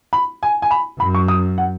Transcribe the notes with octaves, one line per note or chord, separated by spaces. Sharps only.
B5
G#5
G#5
B5
F#2 B5
C#6
D#6
F#5